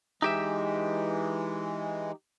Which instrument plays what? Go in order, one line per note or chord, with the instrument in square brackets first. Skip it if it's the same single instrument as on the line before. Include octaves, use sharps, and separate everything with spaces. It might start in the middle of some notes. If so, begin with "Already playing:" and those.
[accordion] E3 G#3 [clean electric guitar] D#4 G4 E5